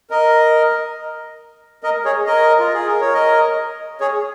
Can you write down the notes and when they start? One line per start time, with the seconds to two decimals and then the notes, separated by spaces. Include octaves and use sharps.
0.10 A#4 D#5
1.83 A#4 D#5
2.05 G#4 C#5
2.27 A#4 D#5
2.59 F4
2.74 G#4
2.87 A#4
3.00 C#5
3.14 A#4 D#5
4.00 G#4 C#5